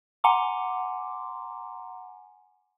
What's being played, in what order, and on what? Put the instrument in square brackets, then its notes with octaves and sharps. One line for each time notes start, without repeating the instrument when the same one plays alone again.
[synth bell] F#5 G#5 A#5 C6 D6